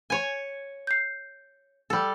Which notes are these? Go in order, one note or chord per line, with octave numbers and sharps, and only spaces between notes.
C#5 G#5
G6 C7
G3 A4